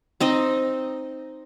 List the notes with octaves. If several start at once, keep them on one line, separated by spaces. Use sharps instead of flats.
C4 D#4 D#5